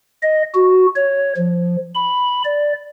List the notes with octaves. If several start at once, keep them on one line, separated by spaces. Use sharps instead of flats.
D#5
F#4
C#5
F3
B5
D5